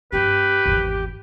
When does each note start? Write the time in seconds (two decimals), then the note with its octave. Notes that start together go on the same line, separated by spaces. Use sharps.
0.12 G2 C4 G4 B4
0.66 G#1 E2